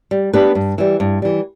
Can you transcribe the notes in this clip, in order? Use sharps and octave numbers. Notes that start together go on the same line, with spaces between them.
G3
B3 D4 G4 B4
G2
E3 G3
G2
E3 G3